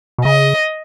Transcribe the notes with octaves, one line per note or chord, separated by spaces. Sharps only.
B2
C#3 D#5